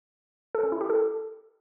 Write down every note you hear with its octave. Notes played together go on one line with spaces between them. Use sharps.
A4
C#4
E4
G4
A4